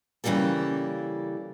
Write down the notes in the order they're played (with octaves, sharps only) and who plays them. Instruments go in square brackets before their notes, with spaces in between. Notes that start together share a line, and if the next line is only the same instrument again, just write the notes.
[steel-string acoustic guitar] C#3 E3 F3 G3 A#3 A4